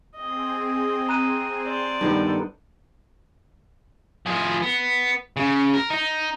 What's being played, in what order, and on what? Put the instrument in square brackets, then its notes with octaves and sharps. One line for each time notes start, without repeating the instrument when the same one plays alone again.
[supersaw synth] C4 G#4 [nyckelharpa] D#5
[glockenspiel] A#5 F#6 D#7
[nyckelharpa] C5 D5
[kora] G2 D#3 B3 [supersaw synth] A4
[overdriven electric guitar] F3 G#4
B3
C#3
A#4
D#4